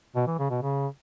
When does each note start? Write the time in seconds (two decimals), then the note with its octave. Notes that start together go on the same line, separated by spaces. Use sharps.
0.15 B2
0.27 E3
0.39 C#3
0.50 B2
0.62 C#3